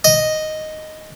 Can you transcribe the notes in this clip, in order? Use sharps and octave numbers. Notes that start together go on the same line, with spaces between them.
D#5